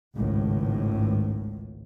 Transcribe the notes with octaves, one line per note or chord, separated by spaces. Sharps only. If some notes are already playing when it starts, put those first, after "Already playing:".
G#1 C#2 A2